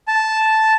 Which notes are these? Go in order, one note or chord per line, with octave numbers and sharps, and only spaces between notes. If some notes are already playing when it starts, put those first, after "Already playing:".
A5